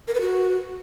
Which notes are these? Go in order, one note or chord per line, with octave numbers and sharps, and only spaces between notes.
A#4
B4
F#4